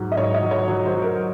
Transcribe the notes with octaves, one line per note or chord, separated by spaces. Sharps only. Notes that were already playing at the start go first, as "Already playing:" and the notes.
Already playing: G#2 F#3
D#5
G#2 C#5
D#5
F#3
C#5
F#3 C#5
C5
F#3
A#4